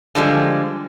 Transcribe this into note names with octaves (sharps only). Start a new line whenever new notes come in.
D3 F3 G3 G#3